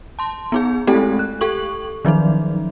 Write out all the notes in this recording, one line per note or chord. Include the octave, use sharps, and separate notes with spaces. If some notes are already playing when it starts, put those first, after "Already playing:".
A5 C6
B3 D#4 G#4
G#3 A3 C4 E4 G4 A4
F#6
G4 A4 C#6 F#7
D#3 F3 F#3 D#4